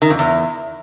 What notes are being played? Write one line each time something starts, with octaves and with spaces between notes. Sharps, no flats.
D#3
F2
E2